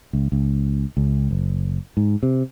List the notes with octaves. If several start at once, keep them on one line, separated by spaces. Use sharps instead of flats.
C#2
C#2
C#2
F#1
G#2
C3